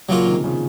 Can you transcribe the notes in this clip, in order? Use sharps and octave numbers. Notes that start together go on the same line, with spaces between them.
A#2 C#3 F#3 A#3 F4
C3 D#3
C#3 F3